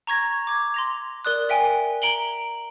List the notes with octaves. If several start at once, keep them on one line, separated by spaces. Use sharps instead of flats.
A#5 C#6 G#6 A#6
D6 G#6
C6 A#6 F7
A#4 D5 D#6 F#6
A#4 E5 G5 G#5
A#5 D7 F#7 G7